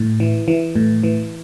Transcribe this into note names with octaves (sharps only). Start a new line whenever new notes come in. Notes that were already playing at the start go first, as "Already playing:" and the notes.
Already playing: A2
E3
E3
A2
E3